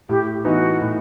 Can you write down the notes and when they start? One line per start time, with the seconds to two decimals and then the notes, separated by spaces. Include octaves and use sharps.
0.09 A2 G4
0.45 E3 B3 D#4 F#4
0.81 A2